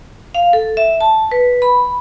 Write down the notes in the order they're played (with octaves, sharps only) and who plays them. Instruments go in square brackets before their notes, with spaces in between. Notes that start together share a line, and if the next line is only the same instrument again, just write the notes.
[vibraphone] F5
A4
E5
A5
B4
B5